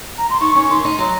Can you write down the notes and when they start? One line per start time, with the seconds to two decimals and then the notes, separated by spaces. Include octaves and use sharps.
0.18 A#5
0.30 C6
0.41 D#3 C#6
0.56 C#4 C#6
0.70 D#3 C6
0.85 D#4
0.99 F#3 A#5